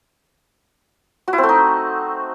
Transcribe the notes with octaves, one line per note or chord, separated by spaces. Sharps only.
F#4
E4
C4
A3
D#4